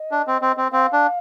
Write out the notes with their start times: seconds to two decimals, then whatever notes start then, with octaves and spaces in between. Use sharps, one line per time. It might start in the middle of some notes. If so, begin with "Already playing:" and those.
Already playing: D#5
0.11 D4
0.27 C4
0.42 C4
0.57 C4
0.72 C4 F5
0.93 D4